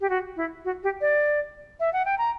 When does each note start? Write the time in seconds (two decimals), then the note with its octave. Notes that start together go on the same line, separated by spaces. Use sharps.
0.01 G4
0.10 F#4
0.36 E4
0.65 F#4
0.83 G4
1.01 D5
1.80 E5
1.93 F#5
2.05 G5
2.18 A#5